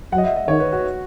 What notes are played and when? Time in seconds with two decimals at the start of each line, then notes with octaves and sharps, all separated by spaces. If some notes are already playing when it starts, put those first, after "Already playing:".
0.12 F#3 F#5
0.18 D#5
0.24 E5
0.36 D#5
0.48 D#3 C#5
0.60 B4
0.72 F#4